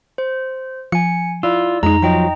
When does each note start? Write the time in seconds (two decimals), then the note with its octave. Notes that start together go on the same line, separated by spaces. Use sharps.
0.18 C5
0.92 F3 G#5 C#7
1.43 E4 F4 D5 E6
1.83 F2 G#3 D#4 A#5
2.02 F3 F#3 D#5 G5 A#5